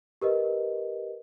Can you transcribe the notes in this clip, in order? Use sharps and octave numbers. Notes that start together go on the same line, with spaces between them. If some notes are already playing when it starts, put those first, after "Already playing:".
G4 A#4 B4 D#5